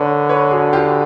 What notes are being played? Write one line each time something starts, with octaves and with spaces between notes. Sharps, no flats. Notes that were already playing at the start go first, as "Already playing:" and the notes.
Already playing: D3 A#4 B4 C#5
B4 C#5
F#4 G#4
F4 G4